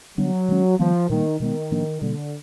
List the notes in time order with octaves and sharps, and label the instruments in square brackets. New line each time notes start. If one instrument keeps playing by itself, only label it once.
[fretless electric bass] D3 G3 B3 D4 [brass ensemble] F#3
[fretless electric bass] D#3 G#3 C#4
[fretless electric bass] D#3 G3 B3 [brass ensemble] F3
[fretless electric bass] A#2 G3 A#3 [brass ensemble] D#3
[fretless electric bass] B2 G#3 B3 [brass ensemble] D#3
[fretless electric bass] A2 F3 A#3 D4
[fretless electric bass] B2 G3 A#3 [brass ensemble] D3